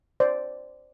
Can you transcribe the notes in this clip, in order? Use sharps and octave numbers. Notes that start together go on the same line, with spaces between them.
C5 D5